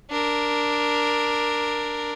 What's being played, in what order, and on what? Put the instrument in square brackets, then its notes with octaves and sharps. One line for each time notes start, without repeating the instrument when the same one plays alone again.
[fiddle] D4 A#4